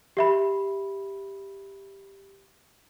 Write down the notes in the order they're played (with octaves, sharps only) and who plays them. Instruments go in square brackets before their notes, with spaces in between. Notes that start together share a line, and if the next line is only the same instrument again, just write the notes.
[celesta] G4 E5 B5